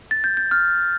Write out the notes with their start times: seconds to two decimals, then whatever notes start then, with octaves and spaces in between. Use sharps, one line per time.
0.11 A6
0.24 G6
0.37 G6
0.51 F6